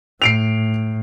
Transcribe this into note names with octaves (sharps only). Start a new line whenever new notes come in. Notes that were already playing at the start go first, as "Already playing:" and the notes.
A2 C7 D7 F7